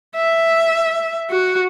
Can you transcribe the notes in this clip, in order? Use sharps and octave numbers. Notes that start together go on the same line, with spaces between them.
E5
F#4